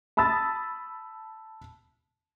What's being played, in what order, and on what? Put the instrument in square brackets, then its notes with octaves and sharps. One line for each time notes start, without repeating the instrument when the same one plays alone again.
[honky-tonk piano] A5 B5 D#6 E6 A6